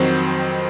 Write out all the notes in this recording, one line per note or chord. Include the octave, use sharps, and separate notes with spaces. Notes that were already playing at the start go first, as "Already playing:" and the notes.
Already playing: F2 D#3 F#3 C4 C5